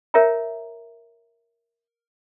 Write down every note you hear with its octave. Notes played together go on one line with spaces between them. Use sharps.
A#4 C#5 E5 G5 A#5